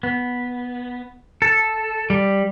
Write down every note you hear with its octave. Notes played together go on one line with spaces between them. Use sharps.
B3
A4
G3